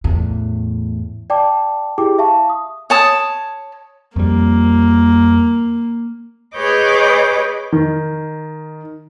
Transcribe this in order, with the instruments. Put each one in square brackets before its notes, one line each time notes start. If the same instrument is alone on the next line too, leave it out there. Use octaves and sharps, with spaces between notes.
[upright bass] E2 A2
[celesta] D5 G5 A5 D6
E4 G4 G#4 G5 D6
E5 F5 A5 C#6
D#6
[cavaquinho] C#5 A5 D#6
[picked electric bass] F2 F3 G3 [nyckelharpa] A#3
[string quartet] G#4 B4 C#5 D#5 D6 G6
[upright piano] D#3